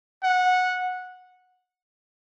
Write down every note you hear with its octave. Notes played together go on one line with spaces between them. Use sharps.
F#5